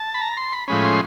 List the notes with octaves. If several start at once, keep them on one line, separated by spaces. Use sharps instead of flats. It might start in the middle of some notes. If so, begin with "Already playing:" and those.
Already playing: A5
B5
A#5
C6
B5
A2 F3 G#3 C#4 B5
C6